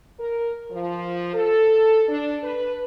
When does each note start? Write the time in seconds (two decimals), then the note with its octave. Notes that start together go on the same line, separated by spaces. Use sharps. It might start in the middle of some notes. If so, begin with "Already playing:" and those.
0.19 A#4
0.70 F3
1.33 A4
2.08 D4
2.43 B4